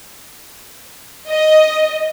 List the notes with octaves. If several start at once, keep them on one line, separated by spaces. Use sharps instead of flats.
D#5